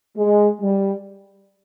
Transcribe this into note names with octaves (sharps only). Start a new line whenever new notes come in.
G#3
G3